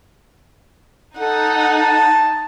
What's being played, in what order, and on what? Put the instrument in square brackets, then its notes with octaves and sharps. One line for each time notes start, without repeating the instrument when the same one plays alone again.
[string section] D#4 [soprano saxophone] A4 [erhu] F#5
[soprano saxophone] A5